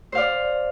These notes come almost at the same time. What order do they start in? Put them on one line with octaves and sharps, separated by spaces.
C5 F5 D5